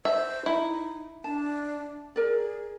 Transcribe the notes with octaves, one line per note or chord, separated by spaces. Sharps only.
C5 E5
D#4 E4
D4 A5
G#4 A#4 D5